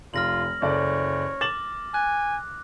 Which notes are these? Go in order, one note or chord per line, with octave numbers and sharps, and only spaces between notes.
F1 F4 F6 A#6 F#7
F#1 A4 C#5 D5
D6 A6 E7 F#7
G#5 F#6